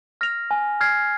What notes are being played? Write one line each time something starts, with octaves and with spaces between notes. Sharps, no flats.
F6 A#6 F7
G#5
F6 G#6 C7